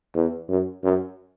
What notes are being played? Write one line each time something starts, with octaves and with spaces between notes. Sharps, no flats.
E2
F#2
F#2